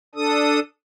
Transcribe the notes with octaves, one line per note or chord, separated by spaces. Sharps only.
D4 A4 D#6